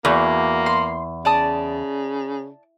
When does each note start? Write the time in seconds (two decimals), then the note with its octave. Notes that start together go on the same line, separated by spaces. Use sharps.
0.05 E2 A#3 F#4 G#4
0.66 C6
1.25 C#3 D5 A5 D#6